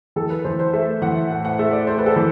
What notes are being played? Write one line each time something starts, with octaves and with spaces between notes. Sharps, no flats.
E3 A4
B4
E3 C5
C5
A3 E5
E3 F#5
A2 F#5
F#5
A3 E5
D5
A3 C5
B4
A4
E3